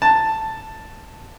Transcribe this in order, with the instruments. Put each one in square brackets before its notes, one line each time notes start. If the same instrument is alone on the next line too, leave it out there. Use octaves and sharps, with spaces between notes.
[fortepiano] A5